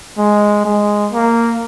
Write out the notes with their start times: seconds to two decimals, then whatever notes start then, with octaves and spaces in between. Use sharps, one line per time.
0.17 G#3
0.65 G#3
1.12 A#3